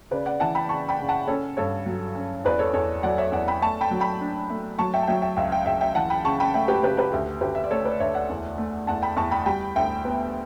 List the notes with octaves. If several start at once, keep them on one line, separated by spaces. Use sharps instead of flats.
C#3 B4 D5
D5 F#5
E3 F#5 A5
G5 B5
C#3 A5 C#6
G5 B5
C#3
F#5 A5
C#4 A4 C#5
G2 A4 C#5
F#3
C#4
E2 B4 D5
A4 C#5
E2 A4 C#5
F#3 D5 F#5
C#5 E5
E2 D5 F#5
G5 B5
A3 A5 C#6
G5 B5
F#3
G5 B5
D4
A3
F#3 A5 C#6
E5 G5
A5
F#3 E5 G5
E5 G5
C#2 E5 G5
E5 G5
C#2 E5 G5
E5 G5
E3 F#5 A5
G5 B5
C#3 A5 C#6
G5 B5
A3 E5 G5
G4 B4
C#3 G4 B4
G4 B4
D2 G4
D2 G4 B4
E5
D5
A3 A4 C#5
B4 D5
D2 C#5 E5
D5 F#5
E2
A3
E2 F#5 A5
G5 B5
E2 A5 C#6
G5 B5
G3 G5 B5
D2 E5 G5
B3